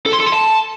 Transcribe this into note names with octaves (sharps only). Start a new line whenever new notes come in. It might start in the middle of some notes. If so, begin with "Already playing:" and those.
A4
C6
A4
C6
A5